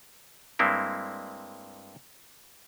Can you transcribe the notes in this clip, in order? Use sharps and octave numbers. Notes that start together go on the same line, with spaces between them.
G2 G#3 A#3 C4 E4